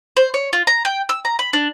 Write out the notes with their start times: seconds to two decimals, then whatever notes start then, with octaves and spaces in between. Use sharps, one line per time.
0.17 C5
0.34 C#5
0.53 F4
0.67 A#5
0.85 G5
1.09 E6
1.25 A#5
1.39 B5
1.53 D4